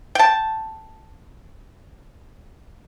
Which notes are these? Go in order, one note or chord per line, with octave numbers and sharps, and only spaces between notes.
G5 A5